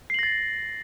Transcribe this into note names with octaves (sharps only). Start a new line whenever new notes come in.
A6 A#6 C7 F#7